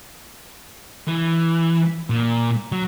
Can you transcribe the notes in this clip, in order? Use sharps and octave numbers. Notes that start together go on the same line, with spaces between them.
E3
A#2
F#3